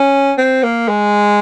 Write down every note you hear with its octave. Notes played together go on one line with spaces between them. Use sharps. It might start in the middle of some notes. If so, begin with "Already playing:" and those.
Already playing: C#4
C4
A#3
G#3